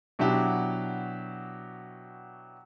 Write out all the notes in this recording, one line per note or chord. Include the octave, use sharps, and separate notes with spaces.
B2 F#3 D4 E4 G4